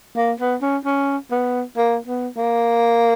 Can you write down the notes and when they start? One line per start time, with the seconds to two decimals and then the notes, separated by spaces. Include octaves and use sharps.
0.16 A#3
0.40 B3
0.62 C#4
0.85 C#4
1.31 B3
1.77 A#3
2.07 B3
2.37 A#3